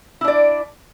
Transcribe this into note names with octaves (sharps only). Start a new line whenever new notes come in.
D4 E4 D5